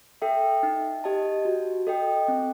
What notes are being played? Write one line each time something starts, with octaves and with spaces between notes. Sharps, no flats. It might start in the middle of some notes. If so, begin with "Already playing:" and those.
A4 E5 G5
D#4
G4 D#5 A5
F#4
A4 D#5 G5
C4